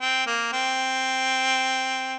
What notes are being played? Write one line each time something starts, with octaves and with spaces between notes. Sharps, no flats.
C4
A#3
C4